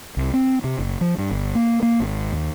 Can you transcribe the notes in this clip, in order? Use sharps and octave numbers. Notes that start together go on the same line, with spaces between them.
C2
C4
C3
F#1
F3
G2
G1
A#3
A#3
G#1
D#2